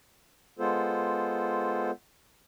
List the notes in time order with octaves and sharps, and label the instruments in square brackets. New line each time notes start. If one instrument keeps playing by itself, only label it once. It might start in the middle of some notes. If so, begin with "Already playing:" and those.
[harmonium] G#3 B3 F4 A4 C5